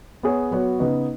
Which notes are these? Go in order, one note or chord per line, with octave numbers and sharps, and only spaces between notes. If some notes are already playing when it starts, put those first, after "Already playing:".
B3 G#4 C#5
F#3 B3 F#4 C#5
C#3 B3 D#4 B4 D#5